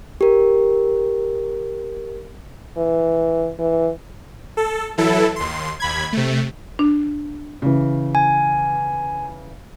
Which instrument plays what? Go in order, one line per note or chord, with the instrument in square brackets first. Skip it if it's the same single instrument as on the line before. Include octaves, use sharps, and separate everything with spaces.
[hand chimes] G4 A#4
[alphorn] E3
E3
[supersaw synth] A4
E3 F#3 E4 A4
D#2 C6
D#2 B5 G#6
C3 A3
[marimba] D4
[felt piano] C#3 E3
[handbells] G#5